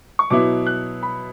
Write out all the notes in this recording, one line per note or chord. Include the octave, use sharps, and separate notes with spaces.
C#6
B2 F#3 B3 E4 D6
F#6
B5